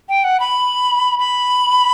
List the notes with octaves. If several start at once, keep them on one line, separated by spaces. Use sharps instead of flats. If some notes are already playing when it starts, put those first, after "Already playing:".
G5
F#5
B5
B5